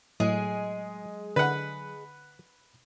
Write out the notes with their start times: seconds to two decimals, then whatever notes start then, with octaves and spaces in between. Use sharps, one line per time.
0.20 A2 F#3 G#3 G#4
1.36 D3 B4 F#5